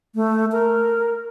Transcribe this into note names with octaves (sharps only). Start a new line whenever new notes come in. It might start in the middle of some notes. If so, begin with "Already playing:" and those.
A3
A#4